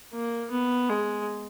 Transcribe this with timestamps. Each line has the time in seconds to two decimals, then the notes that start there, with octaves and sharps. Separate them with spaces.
0.13 A#3
0.52 B3
0.89 G#3